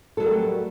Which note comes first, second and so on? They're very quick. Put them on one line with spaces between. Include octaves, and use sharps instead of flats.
A4 F#3 A#4 G3 A3